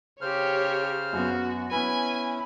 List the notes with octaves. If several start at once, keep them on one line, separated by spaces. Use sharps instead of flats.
C#3 G4 C5 C#5 F6
F#2 B3 F#4
B3 C#4 E4 B4 G#5 B5